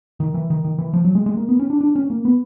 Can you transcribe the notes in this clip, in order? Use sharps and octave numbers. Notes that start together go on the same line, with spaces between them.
D#3
E3
D#3
D#3
E3
F3
F#3
G#3
G#3
A#3
B3
C#4
D4
D4
C#4
A#3
B3